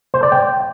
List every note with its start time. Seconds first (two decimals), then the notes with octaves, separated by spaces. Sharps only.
0.14 C5
0.23 D5
0.32 G5